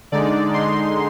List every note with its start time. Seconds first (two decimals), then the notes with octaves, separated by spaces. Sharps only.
0.12 D3 G#3 D#4 D5
0.54 D3 G#3 D#4 C6